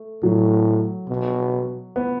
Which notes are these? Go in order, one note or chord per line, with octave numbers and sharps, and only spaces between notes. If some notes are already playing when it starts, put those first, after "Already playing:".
Already playing: A3
A2 F#3
B2
B3